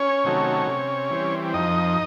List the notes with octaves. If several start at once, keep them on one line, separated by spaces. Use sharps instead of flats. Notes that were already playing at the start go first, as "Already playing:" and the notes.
Already playing: C#4 C#5
C3 D#3 F#3 A3
C3
E3 G3 C4
F2 D#4 D#5